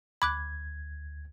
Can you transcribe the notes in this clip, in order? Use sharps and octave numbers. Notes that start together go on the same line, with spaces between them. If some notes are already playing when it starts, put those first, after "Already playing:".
D2 B5 D6 F#6 G#6